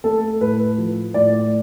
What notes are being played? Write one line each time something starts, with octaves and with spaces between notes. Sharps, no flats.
A3 A4
A2 B4
F3
A2 D5